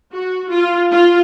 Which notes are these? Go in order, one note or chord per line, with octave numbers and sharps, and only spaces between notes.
F#4
F4
F4